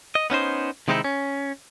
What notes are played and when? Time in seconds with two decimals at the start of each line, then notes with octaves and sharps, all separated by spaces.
0.15 D#5
0.30 B3 C#4 D#4 C5
0.88 C3 D#3 G#3 C4 D#4 E4
1.04 C#4